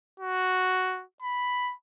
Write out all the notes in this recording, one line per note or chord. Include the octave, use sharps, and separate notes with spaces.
F#4
B5